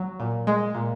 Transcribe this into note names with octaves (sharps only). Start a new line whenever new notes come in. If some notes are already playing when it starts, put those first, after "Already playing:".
Already playing: F#3
A#2
G#3
A#2